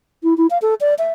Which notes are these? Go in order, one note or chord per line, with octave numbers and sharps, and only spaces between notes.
E4
E4
F5
A4
D5
E5